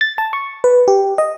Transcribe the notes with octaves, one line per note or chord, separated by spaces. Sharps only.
A6
A5
C#6
B4
G4
D#5